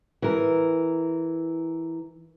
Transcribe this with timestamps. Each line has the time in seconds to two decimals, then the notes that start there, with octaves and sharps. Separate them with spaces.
0.22 E3 A#4